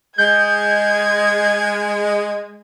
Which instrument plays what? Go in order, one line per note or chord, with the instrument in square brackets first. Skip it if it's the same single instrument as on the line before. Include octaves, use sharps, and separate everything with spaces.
[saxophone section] G#3 [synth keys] G6 [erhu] G#6